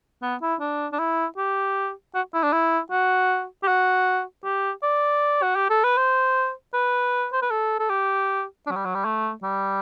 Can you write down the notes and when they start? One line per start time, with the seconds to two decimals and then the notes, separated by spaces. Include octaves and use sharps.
0.22 B3
0.42 E4
0.60 D4
0.92 D4
0.99 E4
1.37 G4
2.14 F#4
2.34 E4
2.43 D4
2.52 E4
2.91 F#4
3.63 G4
3.68 F#4
4.44 G4
4.83 D5
5.43 F#4
5.56 G4
5.70 A4
5.84 B4
5.98 C5
6.74 B4
7.32 C5
7.42 B4
7.51 A4
7.80 A4
7.90 G4
8.67 D4
8.71 F#3
8.76 G3
8.85 F#3
8.95 G3
9.05 A3
9.43 G3